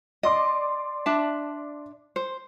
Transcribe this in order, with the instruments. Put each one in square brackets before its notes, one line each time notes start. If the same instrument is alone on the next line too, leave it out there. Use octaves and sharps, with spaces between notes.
[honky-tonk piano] D5 C6 D6 [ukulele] D#5
[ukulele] D4 E5 A5
C5